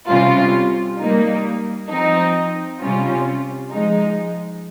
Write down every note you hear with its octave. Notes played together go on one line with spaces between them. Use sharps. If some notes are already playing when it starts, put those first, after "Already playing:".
C3 G3 C#4 F4
G3 A#3 D#4
F3 C4 D#4
C3 G3 C#4 F4
F3 G#3 D#4